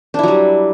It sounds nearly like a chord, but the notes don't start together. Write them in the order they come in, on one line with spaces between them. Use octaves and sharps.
D4 E4 F#3 G3